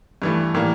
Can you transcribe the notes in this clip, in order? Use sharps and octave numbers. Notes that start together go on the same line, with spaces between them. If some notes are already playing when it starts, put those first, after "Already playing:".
G2 E3 A3
A2 E3 G3 A#3